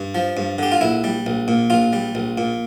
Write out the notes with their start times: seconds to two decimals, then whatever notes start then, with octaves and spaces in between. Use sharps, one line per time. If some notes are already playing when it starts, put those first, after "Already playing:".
Already playing: G2
0.15 F3
0.37 G2
0.58 D3 G4
0.72 F4
0.81 A#1 E4
1.04 G3
1.26 A#1
1.48 A#2
1.70 A#1 F4
1.93 G3
2.15 A#1
2.38 A#2